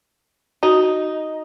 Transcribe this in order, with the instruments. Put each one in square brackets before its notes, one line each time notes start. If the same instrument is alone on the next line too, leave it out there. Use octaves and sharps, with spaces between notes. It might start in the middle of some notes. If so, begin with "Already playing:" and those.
[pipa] D#4 [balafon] F#4